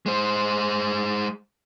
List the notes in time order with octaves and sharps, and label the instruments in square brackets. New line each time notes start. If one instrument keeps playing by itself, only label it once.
[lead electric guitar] G#3 C5